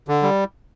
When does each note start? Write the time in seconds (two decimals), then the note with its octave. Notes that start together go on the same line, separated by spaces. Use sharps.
0.08 D3
0.23 G3